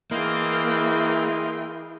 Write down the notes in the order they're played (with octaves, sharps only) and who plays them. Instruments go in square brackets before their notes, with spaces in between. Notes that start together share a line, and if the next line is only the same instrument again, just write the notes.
[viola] E3 G5 [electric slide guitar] A#3 [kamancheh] E4 G#4 [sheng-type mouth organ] D#5 F5 C6